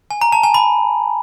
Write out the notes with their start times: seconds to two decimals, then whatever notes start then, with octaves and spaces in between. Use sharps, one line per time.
0.11 G#5
0.21 A#5
0.32 A5
0.43 G#5
0.54 B5